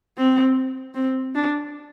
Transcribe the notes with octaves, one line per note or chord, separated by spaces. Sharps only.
C4
C4
D4